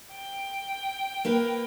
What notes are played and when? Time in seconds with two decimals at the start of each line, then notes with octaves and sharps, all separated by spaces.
0.14 G5
1.25 A#3 A#4 B4